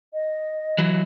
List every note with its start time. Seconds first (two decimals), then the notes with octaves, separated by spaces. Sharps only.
0.13 D#5
0.78 E3 F#3